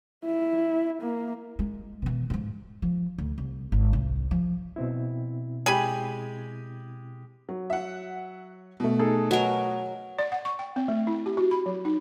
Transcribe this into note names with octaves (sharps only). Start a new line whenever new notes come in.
E4
A#3
G#3
B2 E3
G#2 F3
F3
D2
C2
G#1
C2
F3
B2 C4 E4
G#3 G4 G#4 G#5 B5
F#3
E5 F#5
B2 A3
D#4 G#4 A4
F#3 A#4 B4 D#5 G#5
D5
F#5
C#6
G5
C4
A3
E4
G4
F#4
B5
F#3
D#4